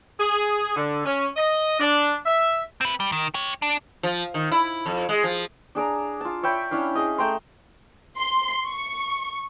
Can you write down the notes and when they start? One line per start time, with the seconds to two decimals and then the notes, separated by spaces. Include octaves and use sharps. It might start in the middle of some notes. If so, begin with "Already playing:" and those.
0.19 G#4
0.76 D3
1.06 C#4
1.36 D#5
1.80 D4
2.26 E5
2.81 C4 B4
3.00 G3
3.12 D#3
3.34 G4 C#5
3.62 D4
4.03 F3
4.34 D#3
4.52 E4
4.86 F2
5.09 G#3
5.24 F3
5.75 D4 G#4 D5 A#5
6.21 F4 A5
6.43 C#5 E5 G5 B5
6.71 C#4 D4 E4 F5
6.95 G#4 D#5
7.18 A3 G5 A#5 C6
8.18 C6
8.67 C#6